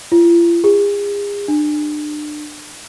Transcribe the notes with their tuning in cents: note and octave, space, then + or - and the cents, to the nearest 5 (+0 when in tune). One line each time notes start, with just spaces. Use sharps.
F4 -45
G#4 -40
D4 +35